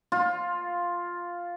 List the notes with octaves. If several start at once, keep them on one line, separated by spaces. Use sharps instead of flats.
F4